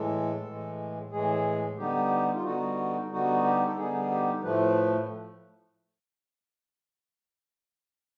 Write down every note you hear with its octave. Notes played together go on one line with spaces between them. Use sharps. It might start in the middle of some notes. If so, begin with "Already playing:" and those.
Already playing: A2 E3 G#3 A4
A2 E3 G#3
A2 E3 G#3 G#4
D3 G3 B3 D#4 G4
F4
D3 G3 B3 D#4 F#4
D3 G3 B3 D#4 F#4
G4
A4
D3 G3 B3 D#4 G#4
G4
A2 F3 A3 B4